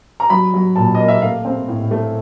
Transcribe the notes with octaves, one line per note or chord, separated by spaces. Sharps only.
A#5
F#3 B5
F#3
A#2 A5
A#3 D#5
E5
A3 F5
C4
A2
A3